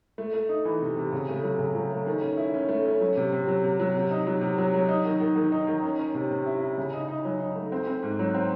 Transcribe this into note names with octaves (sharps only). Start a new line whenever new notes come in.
A3
A3
D#4
E3
C3
C3
C#3
A3
F#3
C#3
F#3
A3
D#3
C#4
E4
C#4
A3
C#4
F#3
C3
C3
F#3
C3
F#3
C3
D#4
F#3
C3
F#3
F#3
D#4
D#3
D#3
D#3
D#4
D#3
C#4
C#4
C3
C3
E4
E4
C#3
D#4
D#4
F#3
D#4
A3
C4
C4
G#2
F#3
C4